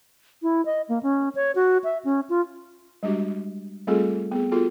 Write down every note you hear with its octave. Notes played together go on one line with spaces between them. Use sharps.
E4
D#5
A#3
C#4
C#5
F#4
E5
C#4
F4
G3 G#3 D4 F#4 G4
G3 A3 C4 F4 G#4 A4
B3 G#4
B3 F4 F#4 G#4 A4